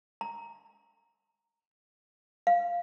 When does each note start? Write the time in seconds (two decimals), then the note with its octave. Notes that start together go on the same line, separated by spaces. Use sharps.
0.21 A#5
2.47 F5